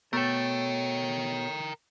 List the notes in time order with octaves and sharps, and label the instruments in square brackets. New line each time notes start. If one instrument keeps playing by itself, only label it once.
[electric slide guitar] B2 [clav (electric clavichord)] A3 A4 [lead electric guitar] A#4 G5 [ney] C#5